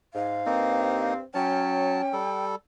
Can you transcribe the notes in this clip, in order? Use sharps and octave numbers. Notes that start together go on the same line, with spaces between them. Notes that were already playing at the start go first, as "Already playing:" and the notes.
G#2 F5
G2 A#3 C4 D#4
F#3 C#4 G5 A5
G3 A4